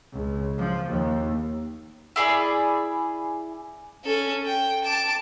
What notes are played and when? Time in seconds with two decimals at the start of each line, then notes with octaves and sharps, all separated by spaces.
0.13 C#2
0.58 F3
0.89 D#2
2.16 E4 G#4 D5 B5
4.04 C#4 A4
4.45 G5
4.84 A5 D6